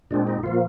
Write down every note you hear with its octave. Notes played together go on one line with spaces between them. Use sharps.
A#2 G#3 C4 D4
D#4
A#2 F3 A#3 F4